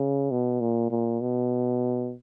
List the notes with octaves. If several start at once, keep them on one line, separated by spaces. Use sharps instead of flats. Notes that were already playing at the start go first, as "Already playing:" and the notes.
Already playing: C#3
B2
A#2
A#2
B2